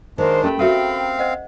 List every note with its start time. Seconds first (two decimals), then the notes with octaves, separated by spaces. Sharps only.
0.18 D#3 G#3 D4 A#4 C5 F5
0.44 A3 C#4 G4 A#4 G5 B5
0.59 A3 C4 F#4 A4 A#4 E5 F5
1.19 C5 D#5 F#5